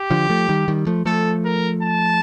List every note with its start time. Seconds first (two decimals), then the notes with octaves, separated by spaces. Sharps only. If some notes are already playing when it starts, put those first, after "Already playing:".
Already playing: G4
0.11 D3 F3
0.30 F3 A3
0.49 D#3 G3
0.68 D#3 G3
0.87 F3 A3
1.05 F3 A3 A4
1.45 A#4
1.83 A5